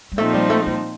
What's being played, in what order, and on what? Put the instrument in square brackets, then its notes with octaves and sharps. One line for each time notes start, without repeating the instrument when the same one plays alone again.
[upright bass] G3
[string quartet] A#2 F3 C4 D#4 [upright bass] A3
[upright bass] G3
A3
G3